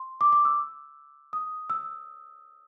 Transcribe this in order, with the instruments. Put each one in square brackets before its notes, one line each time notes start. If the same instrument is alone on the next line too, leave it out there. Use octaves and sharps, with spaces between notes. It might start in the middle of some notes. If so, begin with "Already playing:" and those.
Already playing: [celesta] C6
D6
D6
E6
D#6
E6